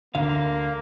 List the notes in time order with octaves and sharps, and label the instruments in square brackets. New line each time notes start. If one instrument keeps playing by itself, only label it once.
[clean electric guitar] D2 D3 F5 [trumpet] A#3